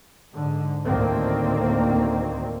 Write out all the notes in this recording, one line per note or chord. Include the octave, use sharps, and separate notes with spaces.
G#2 D3
D2 A2 D#3 A#3 C4